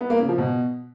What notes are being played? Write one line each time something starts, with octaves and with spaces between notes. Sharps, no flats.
B3
A#3
C#3
F3
B2